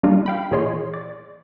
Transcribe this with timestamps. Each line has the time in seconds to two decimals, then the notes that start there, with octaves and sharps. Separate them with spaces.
0.03 G3 A#3 D4 D#4 F4
0.26 F5 G5 B5
0.51 A#2 E3 G#4 C#5 D#5 C6
0.94 D5